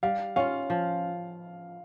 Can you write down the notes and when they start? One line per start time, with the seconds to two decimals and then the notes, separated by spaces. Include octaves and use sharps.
0.03 G3 F5
0.36 C#4 F4 F5
0.70 F3